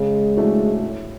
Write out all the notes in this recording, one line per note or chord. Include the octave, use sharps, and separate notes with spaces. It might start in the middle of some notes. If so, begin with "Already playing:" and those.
Already playing: C#3 G#3
E3 A3 D4 F#4
A2